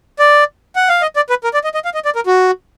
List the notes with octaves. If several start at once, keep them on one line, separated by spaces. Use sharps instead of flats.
D5
F#5
F5
D#5
D5
B4
A#4
D5
D#5
D#5
F5
D#5
D5
A#4
F#4